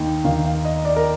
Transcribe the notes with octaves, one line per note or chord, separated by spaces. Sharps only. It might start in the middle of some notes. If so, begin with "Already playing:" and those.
Already playing: D#2 D#3 A#3 D#4 G5
D#2 D#3 A#3 D#4 F5
F5
D#5
D5
A#4